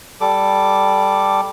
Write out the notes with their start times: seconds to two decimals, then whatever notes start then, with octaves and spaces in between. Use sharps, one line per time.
0.21 G3 A4 D6